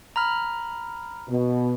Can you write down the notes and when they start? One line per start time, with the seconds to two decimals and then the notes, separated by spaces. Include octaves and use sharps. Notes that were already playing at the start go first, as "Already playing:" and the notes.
0.16 A#5 B5 F6
1.29 B2